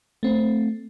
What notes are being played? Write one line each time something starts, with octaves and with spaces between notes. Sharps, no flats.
A3 C4